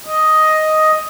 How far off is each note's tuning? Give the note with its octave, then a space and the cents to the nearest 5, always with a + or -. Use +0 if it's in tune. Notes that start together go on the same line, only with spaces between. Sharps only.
D#5 +5